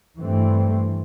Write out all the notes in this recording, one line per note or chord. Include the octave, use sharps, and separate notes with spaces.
G2 E3 A3 C4